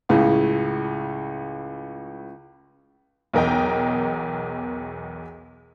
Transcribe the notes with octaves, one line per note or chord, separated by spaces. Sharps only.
C#2 A2 C#3
B1 E2 A#4 D#5 G5